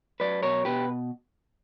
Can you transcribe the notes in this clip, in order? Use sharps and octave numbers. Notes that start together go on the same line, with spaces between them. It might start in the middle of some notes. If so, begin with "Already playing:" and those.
F#3 B4 D5
B2 A#4 C#5
B2 G4 B4